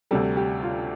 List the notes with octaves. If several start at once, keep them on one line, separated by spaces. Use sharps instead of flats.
D2 C3 G3 A4
G4
F4